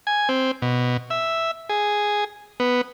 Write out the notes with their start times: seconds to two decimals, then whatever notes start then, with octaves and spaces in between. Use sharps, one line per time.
0.07 G#5
0.29 C4
0.62 B2
1.10 E5
1.69 G#4
2.60 B3